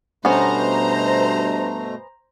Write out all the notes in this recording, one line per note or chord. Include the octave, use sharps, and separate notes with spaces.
G2 B2 A3 B3 C#4 C5 A#5